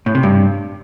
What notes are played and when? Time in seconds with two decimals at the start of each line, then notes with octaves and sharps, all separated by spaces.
0.06 A2
0.15 C3
0.23 G2